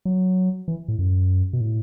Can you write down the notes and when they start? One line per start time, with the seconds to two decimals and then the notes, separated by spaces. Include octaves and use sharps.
0.05 F#3
0.68 E3
0.88 A2
0.99 F#2
1.53 B2
1.61 A2